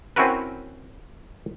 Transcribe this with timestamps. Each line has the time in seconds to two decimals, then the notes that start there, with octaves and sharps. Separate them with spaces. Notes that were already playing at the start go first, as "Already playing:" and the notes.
0.16 C4 C#4 E4 F#4 A#4 B4